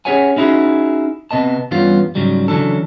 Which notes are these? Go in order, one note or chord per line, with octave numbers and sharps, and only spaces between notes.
C#4 G4 G#4 C#5 F#5 G#5
C#4 D#4 E4 F#4 G#4
C3 B3 D#5 A5
G2 E3 G3 B3 C#4 F4
G#2 C#3 F#3 G3
C#3 E3 F#3 D4 A4